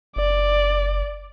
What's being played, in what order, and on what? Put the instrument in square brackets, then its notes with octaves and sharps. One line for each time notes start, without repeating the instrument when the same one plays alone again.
[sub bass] F#1 [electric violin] D5